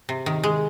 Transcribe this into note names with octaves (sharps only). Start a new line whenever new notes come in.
C3
D#3
G#3